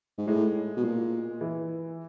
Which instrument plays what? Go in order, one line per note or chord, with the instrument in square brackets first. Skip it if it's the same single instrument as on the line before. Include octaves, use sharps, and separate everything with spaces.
[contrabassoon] G#2
[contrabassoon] A2 [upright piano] G#3
[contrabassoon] B2
A#2
[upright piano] E3